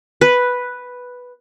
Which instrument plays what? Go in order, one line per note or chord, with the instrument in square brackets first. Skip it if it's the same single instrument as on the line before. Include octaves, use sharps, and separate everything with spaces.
[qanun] B4